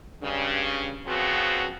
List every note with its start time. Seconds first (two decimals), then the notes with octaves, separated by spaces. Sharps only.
0.22 G2 C#3
1.07 C#3 F3 B3 C4 F#4